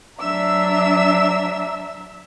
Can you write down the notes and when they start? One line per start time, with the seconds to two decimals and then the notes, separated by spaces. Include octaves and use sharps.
0.20 F#3 D4 E5 A#5 E6